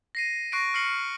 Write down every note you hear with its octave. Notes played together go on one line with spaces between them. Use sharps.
A#6 C7 D#7
C#6 F#6 A#6 C7 D7 D#7
F6 C7 C#7 F#7